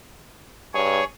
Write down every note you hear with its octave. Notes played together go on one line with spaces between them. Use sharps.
G2 G#4 C#5